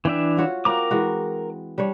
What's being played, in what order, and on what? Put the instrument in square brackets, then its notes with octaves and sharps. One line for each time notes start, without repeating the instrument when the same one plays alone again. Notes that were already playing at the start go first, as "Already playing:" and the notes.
[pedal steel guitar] E3 D4 E5 [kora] G5
[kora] F4 F#4 C#5
[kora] C4 F4 F#4 [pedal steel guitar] A#4 A#5 D6
[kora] E3 G#3 F#4
G3 D4 C#5